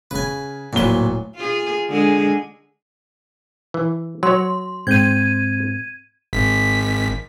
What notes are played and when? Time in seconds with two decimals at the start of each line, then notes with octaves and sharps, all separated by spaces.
0.11 C#3 B4 G#5
0.73 D1 A#2 F#3 B4 G7
1.36 F4 G#4
1.89 D3 G#3 G#4
3.74 E3
4.23 F#3 C#5 C6
4.87 G#2 C4 G6 G#6 D#7
6.33 G#1 B6